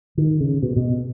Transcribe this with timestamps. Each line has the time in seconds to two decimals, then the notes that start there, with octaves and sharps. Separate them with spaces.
0.17 D#3
0.40 C#3
0.62 B2
0.76 B2